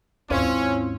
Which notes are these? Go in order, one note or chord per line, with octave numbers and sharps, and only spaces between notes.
D#2 G#2 C4 C#4 E4 F4 C5 C6